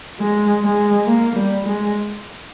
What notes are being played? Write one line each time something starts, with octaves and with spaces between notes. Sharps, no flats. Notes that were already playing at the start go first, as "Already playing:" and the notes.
G#3
G#3
A#3
G3
G#3